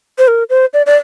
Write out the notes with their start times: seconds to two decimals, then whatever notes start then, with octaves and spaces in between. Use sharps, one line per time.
0.18 C5
0.28 A#4
0.50 C5
0.74 D5
0.86 D5